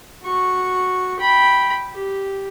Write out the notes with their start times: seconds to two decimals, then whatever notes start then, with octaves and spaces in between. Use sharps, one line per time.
0.24 F#4 C#6
1.20 G5 B5
1.93 G4